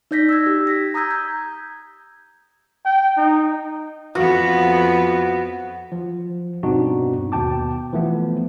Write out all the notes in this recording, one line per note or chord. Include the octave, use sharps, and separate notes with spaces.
D#4 D5 G6 A#6 B6
E6 G#6
G4
A#6 B6
A#5 D#6 E6 G6 G#6
G6
G5
D#4
F2 B3 F#4 F#5
F3
G2 B2 C4 D4 D#4 F#4
D#2 B2 G5 A5 D6
E3 F3 A3 B3